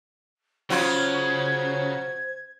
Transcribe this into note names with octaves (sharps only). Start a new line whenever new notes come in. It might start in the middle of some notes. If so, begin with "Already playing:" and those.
C#3 F#3 F4 C5 G#6